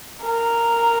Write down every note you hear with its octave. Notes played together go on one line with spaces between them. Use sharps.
A#4